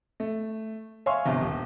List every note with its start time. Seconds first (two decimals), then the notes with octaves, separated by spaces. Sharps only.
0.20 A3
1.06 C#5 E5 F5 G#5 C6 C#6
1.26 G1 C3
1.41 D#1